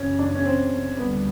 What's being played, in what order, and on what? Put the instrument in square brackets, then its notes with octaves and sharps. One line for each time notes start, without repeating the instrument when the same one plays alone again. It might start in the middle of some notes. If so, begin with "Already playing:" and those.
Already playing: [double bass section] F#2 C#3 E3 [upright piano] C#4
[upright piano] D4
C#4
C4
[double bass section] D2 D3 G3 [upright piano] B3